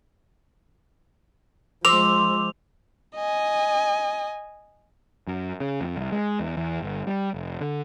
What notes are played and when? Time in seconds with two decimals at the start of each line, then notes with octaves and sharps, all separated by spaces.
1.85 F3 G#3 C5 C6 D6 E6 F7
3.16 D#5 G#5
5.27 F#2
5.60 C#3
5.81 F2
5.96 C2
6.12 G#3
6.40 E2
6.57 E2
6.82 G1
7.07 G3
7.34 F1
7.61 D3